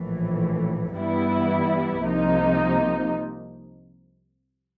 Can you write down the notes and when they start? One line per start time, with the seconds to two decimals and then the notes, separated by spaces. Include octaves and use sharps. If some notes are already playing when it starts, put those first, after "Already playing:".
Already playing: A#1 A2 E3
0.94 G2 E3 G3 B3 E4
2.02 C2 C3 F3 A#3 D#4